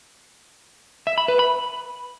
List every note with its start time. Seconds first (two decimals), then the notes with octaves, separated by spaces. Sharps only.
1.07 E5
1.18 B5
1.28 B4
1.39 B5